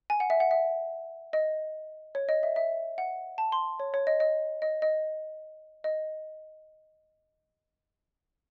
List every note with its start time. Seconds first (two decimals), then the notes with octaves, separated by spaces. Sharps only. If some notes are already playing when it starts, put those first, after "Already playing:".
0.10 G#5
0.20 F#5
0.30 E5
0.40 F#5
0.51 E5
1.33 D#5
2.15 C#5
2.29 D#5
2.43 E5
2.56 E5
2.98 F#5
3.38 A5
3.52 C6
3.80 C#5
3.94 C#5
4.07 D#5
4.20 D#5
4.62 D#5
4.82 D#5
5.84 D#5